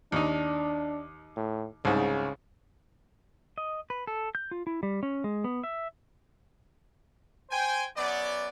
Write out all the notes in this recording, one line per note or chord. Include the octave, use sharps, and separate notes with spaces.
D#2 D4 D#4
A2
C2 G#2 C#3
D#5
B4
A4
G6
F4
E4
G3
C#4
G#3
B3
E5
C5 G5 G#5
F#2 B3 D5